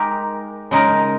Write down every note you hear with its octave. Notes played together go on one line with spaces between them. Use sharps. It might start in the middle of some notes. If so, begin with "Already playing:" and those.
Already playing: G#3 D#4 G4 A#4
C#3 G#3 D#4 A#4